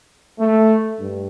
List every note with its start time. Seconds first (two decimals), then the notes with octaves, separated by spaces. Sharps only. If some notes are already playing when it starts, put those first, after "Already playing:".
0.39 A3
0.99 G2